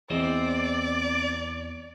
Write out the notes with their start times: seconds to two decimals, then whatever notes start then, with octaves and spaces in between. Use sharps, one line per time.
0.10 E2 C4 C5 D5 D#5